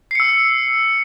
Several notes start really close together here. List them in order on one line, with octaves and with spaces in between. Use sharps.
C7 C#7 E6